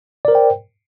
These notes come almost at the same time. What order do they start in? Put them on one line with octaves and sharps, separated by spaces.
D5 A#4 C5 G5